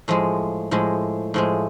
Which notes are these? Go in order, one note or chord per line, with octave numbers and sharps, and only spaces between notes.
A2 F3 G#3
A2 F3 G#3
A2 F3 G#3